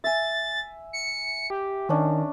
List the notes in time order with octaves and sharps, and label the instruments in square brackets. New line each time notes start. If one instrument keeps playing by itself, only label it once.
[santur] E5 G#5 [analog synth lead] A6
[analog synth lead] C#7
G4
[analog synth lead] D#3 [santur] C#4 D4